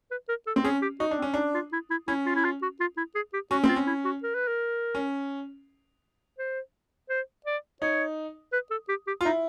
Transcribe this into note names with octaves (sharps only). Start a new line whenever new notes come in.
B4
A#4
A4
C4
C#4 G#4
G4
D#4 F#4
D4
C4
C#4
D4 D#4
F4
E4
E4
C#4 E4
F4
E4
F4
F#4
F4
E4
G#4
G4
C#4 F#4
C4
F4
C#4
E4
F#4
A#4
B4
A#4
C#4
C5
C5
D5
D#4 C#5
B4
A4
G4
G4
F4
D#4 E4